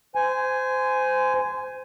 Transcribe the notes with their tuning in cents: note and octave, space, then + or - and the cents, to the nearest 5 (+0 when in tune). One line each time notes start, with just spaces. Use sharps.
C5 -25 G#5 +5